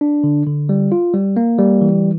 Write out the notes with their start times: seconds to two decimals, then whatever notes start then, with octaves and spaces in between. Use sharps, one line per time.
0.01 D4
0.24 D3
0.47 D3
0.69 G3
0.92 F4
1.14 G3
1.37 A#3
1.59 G3
1.81 E3